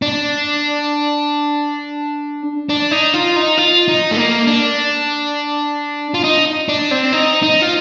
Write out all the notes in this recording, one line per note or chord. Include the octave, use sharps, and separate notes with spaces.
D4
D4
D#4
F4
D#4
F4
D#4
A3
A#3
D4
F4
D#4
D4
C4
D#4
D#4
F4